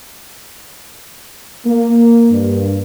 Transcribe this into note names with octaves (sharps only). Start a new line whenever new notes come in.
A#3
G2